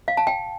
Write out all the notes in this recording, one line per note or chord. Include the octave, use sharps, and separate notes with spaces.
F5
A5
G5